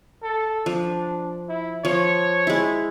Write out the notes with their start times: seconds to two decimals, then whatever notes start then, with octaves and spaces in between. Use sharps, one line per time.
0.23 A4
0.66 F3 D4
1.49 E4
1.85 F3 C#5
2.47 G#3 E4